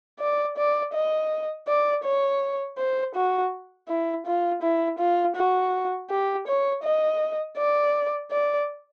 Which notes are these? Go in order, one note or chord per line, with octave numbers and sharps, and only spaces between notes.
D5
D5
D#5
D5
C#5
C5
F#4
E4
F4
E4
F4
F#4
G4
C#5
D#5
D5
D5